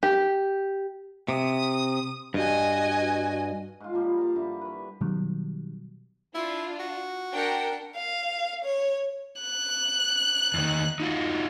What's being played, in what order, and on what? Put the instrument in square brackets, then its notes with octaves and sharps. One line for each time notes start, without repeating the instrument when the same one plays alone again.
[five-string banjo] G4
[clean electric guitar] C3 [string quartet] D#6
[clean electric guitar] G2 [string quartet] F#4 D#5 G#5
[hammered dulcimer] G#2 F4
A#2 D3 F3 G3
A#4 F5 A5
G2 D3 E4 E5
B4 C#5
[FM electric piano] B2 D#3 F#3 G3
[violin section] D4 F4 [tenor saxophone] E4
[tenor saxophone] F#4
[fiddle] D4 F#5 [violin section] A#4 G5
[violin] F5
C#5
F#6
[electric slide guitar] E2 D#3
D#4 F4 F#4